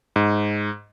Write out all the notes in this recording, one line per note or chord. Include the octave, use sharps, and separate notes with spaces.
G#2